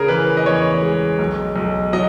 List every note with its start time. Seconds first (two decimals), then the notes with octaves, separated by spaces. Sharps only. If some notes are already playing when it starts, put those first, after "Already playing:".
Already playing: C#3 G#4 A#4
0.08 E3 B4
0.37 D#5
0.46 E2 C#5
0.82 G#3
1.19 B1
1.56 B1
1.93 F#3 D#5